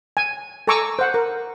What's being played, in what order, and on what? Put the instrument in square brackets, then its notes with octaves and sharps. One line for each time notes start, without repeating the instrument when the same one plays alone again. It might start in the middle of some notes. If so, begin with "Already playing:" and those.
[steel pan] G#5
A4 G#5 A#5 C#6 D6 E6
C5 F#5
A#4